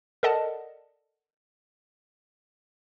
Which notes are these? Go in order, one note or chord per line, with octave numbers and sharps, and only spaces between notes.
A4 A#4 D5 D#5 F#5 A5